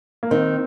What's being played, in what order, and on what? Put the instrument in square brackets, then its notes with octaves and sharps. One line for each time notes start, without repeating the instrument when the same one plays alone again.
[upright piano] A#3
[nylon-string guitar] D#3 [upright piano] C4